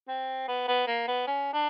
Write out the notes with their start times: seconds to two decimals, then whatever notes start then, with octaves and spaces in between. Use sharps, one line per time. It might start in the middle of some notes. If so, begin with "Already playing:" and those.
0.08 C4
0.48 B3
0.68 B3
0.87 A#3
1.07 B3
1.27 C#4
1.53 D4